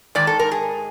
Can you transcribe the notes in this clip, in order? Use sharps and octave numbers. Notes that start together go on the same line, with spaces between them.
G#2 D#3 D5
A4
A#4
G#4